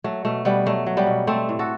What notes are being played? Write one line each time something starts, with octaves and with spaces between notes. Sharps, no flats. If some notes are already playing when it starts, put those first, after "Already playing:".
F#3 A3
B2 A3
B2 G3 B3
F#3 A3
F#3
G3 B3
B2
G3 A3 C4
A2
F#4 A4